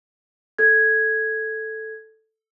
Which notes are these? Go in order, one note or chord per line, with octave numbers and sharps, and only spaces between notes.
A4 G#6